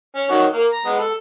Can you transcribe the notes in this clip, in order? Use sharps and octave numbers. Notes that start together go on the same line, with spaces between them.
C#4
D#3 F#4 C#5
A#3
A#5
G#3 B3
A4